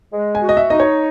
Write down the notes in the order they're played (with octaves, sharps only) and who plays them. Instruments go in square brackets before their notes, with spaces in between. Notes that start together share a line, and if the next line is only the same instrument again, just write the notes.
[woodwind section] G#3
[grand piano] G#5
[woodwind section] F#4
[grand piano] D#5
E5
[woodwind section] D#4 [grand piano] D#5
[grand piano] C#5